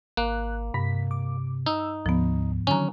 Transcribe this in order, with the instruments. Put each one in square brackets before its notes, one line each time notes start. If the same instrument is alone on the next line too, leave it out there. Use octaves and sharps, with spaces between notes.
[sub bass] G#1 [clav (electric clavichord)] A#3 [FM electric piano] F#6
[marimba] G2 [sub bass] C3 [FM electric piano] B6
[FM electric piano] D6
[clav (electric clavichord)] D#4 [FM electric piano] E6
[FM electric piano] D2 [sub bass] G#2 [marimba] F3 B3
[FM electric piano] D3 D#3 F#3 [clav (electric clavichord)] C#4 [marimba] G#5 A#5